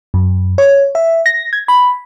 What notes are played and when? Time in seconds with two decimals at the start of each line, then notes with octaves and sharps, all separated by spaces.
0.14 F#2
0.58 C#5
0.95 E5
1.26 A#6
1.53 G#6
1.68 B5